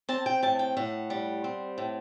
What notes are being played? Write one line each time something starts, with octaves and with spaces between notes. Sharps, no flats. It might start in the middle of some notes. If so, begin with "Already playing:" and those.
C4 A5
G5
A2 A5
G5
A2 F#5
G3
C4
A2